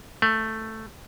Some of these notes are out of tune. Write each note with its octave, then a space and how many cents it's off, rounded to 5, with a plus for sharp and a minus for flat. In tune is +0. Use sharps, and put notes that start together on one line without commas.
A3 +5